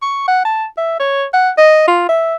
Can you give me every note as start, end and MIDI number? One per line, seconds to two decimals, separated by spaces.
0.02 0.26 85
0.28 0.44 78
0.45 0.65 81
0.78 0.96 76
1.00 1.26 73
1.34 1.50 78
1.58 1.85 75
1.88 2.05 65
2.09 2.36 76